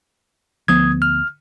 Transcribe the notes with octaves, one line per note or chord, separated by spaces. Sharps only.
D2 F3 B3 D#6 G#6
F6